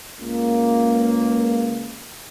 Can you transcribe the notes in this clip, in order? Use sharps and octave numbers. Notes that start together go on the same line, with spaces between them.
C#2 A#3